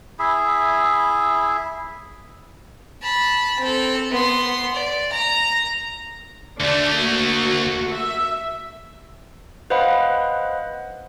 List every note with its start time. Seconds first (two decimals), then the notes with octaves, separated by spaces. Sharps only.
0.19 E4 G#4 E5
3.03 A5 B5
3.59 C4 A4
4.11 B3 C6
4.74 D5
5.12 A#5
6.60 D2 A3 D4 D5
6.97 A#3 F#4
7.92 E5
9.70 B4 C5 D#5 F5 F#5 B5